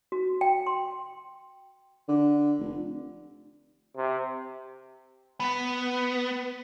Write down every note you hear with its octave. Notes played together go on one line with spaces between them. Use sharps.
F#4
G5
C6
D3
F1
C3
B3